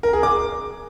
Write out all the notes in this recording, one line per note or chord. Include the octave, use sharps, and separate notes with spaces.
A#4
G#4
D6